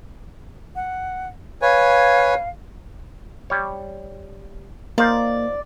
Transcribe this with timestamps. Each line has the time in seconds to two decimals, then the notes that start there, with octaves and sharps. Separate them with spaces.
0.76 F#5
1.62 B4 C#5 F5 G#5
3.50 G3 C#5
4.98 A#3 D#4 F4 C5 D5